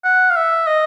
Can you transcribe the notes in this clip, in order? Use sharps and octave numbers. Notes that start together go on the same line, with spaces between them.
F#5
F5
E5
D#5